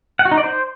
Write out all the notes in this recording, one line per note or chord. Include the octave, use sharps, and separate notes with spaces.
F#5
F#4
D#4
D5
C5